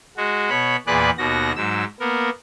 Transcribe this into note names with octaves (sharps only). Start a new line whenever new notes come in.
G#3 F#4
B2 C#5 B5
E2 A#2 G#4 B4 D5 F#6
D#2 B2 F#4 A#6
G#2 F#3 E6
A#3 B3 A#4